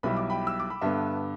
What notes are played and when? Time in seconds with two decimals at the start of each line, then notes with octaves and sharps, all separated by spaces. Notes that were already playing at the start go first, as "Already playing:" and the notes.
0.03 B1 B2 G3 E4 B5
0.17 D6
0.30 G5 B5
0.47 E6
0.60 D6
0.70 B5
0.81 G2 D3 B3 E5 A5